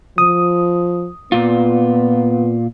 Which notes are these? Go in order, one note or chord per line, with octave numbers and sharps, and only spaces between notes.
F3 D#6
A#2 B3 F4